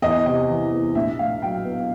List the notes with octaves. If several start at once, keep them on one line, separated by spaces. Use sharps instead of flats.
E2 D#5
C3 D#5
E3
E2
A#1 E5
A2 F5
F#3 G5
B3